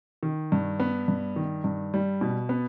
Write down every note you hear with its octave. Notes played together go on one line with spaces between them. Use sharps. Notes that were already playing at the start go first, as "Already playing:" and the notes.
D#3
G2
B3
G2
D#3
G2
G3
B2
B3